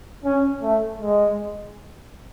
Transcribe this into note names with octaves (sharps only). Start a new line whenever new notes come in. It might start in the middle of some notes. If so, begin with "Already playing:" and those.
C#4
A3
G#3